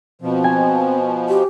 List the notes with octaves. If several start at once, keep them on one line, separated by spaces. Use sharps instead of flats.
B2 F3 C4
G#5
G4